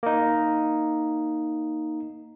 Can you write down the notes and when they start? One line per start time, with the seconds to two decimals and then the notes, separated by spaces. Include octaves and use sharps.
0.03 A#3 D#4